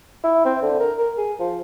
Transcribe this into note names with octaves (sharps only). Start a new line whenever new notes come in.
E4
C4
D3
A#4
A#4
G#4
F3